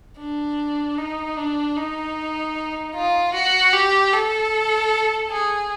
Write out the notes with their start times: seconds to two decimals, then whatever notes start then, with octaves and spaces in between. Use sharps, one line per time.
0.19 D4
0.98 D#4
1.37 D4
1.77 D#4
2.95 F4
3.34 F#4
3.73 G4
4.14 A4
5.31 G#4